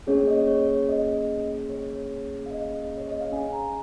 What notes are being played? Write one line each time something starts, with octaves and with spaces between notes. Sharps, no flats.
A#3 C#4 G#4 C#5
D#5
C#5
D#5
C#5
F5
D#5
C#5
D#5
F5
C#4 G#4 G#5
A#5